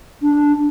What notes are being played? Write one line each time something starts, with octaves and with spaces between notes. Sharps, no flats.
D4